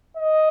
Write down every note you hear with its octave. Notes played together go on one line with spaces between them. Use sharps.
D#5